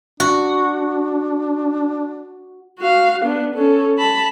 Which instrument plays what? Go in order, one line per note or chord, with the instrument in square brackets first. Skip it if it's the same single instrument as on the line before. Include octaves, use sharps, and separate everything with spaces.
[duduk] D4 [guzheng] F#4
[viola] F#4 F5
B3 D4
C#4 A4
A5 B5